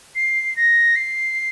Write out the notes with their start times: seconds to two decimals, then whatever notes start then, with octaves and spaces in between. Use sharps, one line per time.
0.15 C7
0.56 A#6
0.96 C7